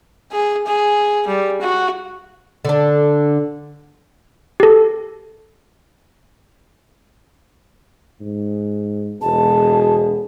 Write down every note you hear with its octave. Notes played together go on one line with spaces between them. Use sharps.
G#4
G#4
G3
F#4
D3 D4
G4 A4
G#2
E1 B2 G#4 A5